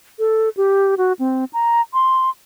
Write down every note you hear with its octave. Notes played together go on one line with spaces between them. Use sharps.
A4
G4
F#4
C4
A#5
C6